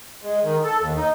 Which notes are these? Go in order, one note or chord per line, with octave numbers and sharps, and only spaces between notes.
G#3
D#3
A4
D#2
D#4